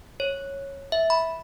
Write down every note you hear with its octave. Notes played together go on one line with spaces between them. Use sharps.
C#5
E5
B5